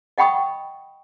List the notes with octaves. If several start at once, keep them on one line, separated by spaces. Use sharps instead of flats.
D#5 F#5 G5 B5 C#6 D#6